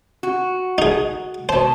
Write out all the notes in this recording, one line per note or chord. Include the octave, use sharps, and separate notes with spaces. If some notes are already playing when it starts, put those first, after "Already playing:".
F#4
D#4 G#4
B2 C5 A5